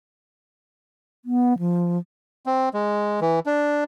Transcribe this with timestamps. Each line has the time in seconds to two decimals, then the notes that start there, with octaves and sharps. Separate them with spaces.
1.25 B3
1.59 F3
2.46 C4
2.74 G#3
3.21 E3
3.46 D4